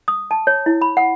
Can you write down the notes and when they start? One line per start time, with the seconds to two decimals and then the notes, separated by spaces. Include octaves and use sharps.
0.08 D#6
0.31 A5
0.47 C#5
0.66 E4
0.81 B5
0.97 F#5